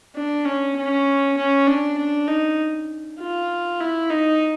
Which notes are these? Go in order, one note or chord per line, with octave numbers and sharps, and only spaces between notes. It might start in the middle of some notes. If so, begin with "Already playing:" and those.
D4
C#4
C#4
C#4
D4
D4
D#4
F4
E4
D#4